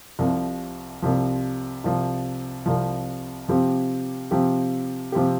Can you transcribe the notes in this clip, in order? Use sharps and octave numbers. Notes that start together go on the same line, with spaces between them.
C2 C3 F3
C2 C3 F3
C2 C3 F3
C2 C3 F3
C3 F3 C4 G4
C3 F3 C4 G4
C3 F3 C4 G4